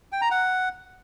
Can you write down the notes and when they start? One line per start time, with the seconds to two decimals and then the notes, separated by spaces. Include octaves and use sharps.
0.12 G5
0.22 A#5
0.31 F#5